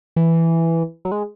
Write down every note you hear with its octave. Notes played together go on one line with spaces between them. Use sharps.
E3
F#3
G#3